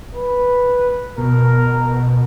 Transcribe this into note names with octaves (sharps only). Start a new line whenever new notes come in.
B4
B2 A#4